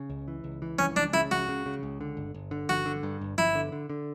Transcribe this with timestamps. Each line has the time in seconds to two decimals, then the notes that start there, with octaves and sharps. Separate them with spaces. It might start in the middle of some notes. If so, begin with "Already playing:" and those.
Already playing: C#3
0.10 C#2
0.28 E3
0.44 C#2
0.62 E3
0.79 C#2 C#4
0.96 C#2 D4
1.13 C#3 E4
1.31 C#2 F#4
1.49 C#3
1.66 C#3
1.83 C#2
2.01 D3
2.17 G1
2.34 G1
2.51 D3
2.69 G1 F#4
2.86 D3
3.03 G2
3.21 G1
3.38 G1 E4
3.55 D3
3.72 D3
3.90 D3